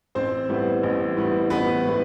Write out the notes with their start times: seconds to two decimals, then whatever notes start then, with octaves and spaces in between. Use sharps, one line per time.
0.15 A1 C4 C5
0.49 A2 G3 B3
0.83 A1
1.17 A2 G3 B3
1.50 A1 B3 B4
1.84 A2 G3 B3